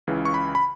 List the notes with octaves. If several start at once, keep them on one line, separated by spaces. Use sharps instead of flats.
C#2 C#3 E3
C#6
B5
B5